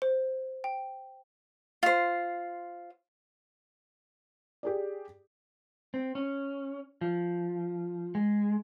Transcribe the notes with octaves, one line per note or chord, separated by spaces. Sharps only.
C5
G5
F4 C5
G4 G#4 D5
C4
C#4
F3
G#3